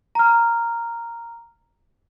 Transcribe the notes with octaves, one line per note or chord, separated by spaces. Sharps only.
A#5 F6